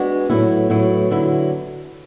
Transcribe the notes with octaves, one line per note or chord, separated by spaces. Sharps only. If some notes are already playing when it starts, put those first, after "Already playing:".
Already playing: G#3 B3 D4 F#4
A2 F#3 B3 E4
A2 F#3 B3 E4
D3 F#3 B3 E4